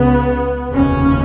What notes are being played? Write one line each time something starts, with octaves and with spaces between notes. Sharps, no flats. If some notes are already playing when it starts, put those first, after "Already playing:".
Already playing: C#2 C#3 B3
F1 D#2 C#3 C#4